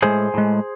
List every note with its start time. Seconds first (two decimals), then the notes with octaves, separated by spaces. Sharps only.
0.02 A2 G#3 G#4 C5
0.34 A2 G#3